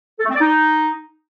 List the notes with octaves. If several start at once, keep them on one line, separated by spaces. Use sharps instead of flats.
A4
A3
C4
D5
D#4